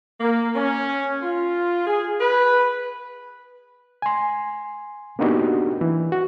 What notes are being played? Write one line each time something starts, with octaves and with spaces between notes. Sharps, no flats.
A#3
C#4
F4
G#4
B4
G#5 C6
A#3 B3 D4 D#4 F#4 G4
E3
F#4